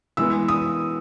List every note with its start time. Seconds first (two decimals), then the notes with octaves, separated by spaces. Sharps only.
0.17 E3 G#3 B3 E6
0.48 D#6